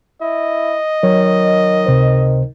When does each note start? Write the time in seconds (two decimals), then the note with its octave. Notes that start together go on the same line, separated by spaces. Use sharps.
0.21 E4 D#5
1.03 D#3 F#3 C#5
1.86 C#2 C3 C5